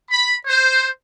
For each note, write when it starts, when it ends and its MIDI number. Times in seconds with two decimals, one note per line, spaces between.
0.10 0.35 83
0.47 0.87 72